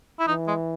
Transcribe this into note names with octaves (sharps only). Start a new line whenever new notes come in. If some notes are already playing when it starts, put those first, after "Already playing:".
E4
E3 D#4
G#3